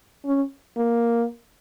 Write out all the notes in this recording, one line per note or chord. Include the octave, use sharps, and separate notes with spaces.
C#4
A#3